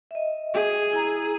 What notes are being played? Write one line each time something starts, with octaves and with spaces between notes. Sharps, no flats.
D#5 E5
G#4
E4 A#5